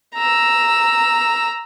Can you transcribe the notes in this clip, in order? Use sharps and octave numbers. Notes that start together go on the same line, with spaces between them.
A#5 E6